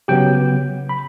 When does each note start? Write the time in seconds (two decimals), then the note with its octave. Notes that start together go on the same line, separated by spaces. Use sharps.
0.08 C#3 F#3 B3 G4 G5
0.89 B5